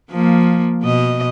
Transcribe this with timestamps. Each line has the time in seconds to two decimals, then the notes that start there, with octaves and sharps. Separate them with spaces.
0.11 F3 A#3
0.83 B2 D#5